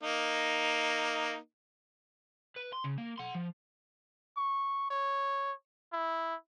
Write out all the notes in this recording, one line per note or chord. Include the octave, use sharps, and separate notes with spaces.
A#3 D#4
B4
C6
C#3
A#3
F#5 C6
F3
C#6
C#5
E4